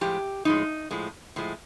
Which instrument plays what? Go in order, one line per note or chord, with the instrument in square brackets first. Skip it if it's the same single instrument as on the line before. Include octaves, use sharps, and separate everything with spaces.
[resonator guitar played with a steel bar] A2 F3 G#3 G4
A2 F3 G#3 D#4
A2 F3 G#3
A2 F3 G#3